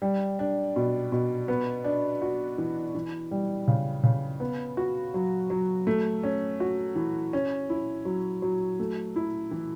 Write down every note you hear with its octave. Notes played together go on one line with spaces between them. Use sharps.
G3
D4
B2
B2
B3
D4
F#4
E3
E3
G3
C#3
C#3
B3
F#4
F#3
F#3
A3
C#4
F#4
E3
C#4
E4
F#3
F#3
A3
E4
E3